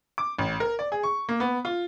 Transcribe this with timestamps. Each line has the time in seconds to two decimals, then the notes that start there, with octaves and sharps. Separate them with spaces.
0.18 D6
0.39 A1
0.60 A#4
0.79 D5
0.92 G#4
1.03 C#6
1.29 A#3
1.40 B3
1.65 F4